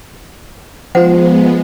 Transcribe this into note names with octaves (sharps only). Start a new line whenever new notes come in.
F3 G#3 B3 F4 C5 F#5